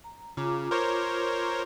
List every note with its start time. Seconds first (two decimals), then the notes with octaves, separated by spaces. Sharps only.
0.04 A#5
0.37 C#3 F4 A#5 D6
0.71 A#4 C5 C#5